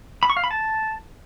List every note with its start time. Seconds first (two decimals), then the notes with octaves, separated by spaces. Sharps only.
0.23 B5
0.30 C#6
0.37 F5
0.44 B5
0.51 A5